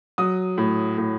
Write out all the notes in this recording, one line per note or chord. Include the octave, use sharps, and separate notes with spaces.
F#3 D#6
A2
A2